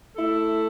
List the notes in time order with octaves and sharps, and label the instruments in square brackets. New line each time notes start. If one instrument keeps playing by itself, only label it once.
[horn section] A3 E4 A4